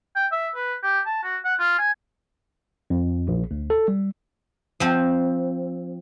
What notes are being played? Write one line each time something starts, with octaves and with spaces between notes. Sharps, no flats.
G5
E5
B4
G4
A5
F#4
F#5
F4
G#5
F2
A#1
D2
A4
G3
F3 C4